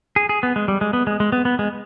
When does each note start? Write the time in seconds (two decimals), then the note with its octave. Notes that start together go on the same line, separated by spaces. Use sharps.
0.16 G#4
0.29 G#4
0.43 B3
0.56 G#3
0.68 G3
0.81 G#3
0.93 B3
1.07 G#3
1.20 G#3
1.32 B3
1.45 B3
1.59 G#3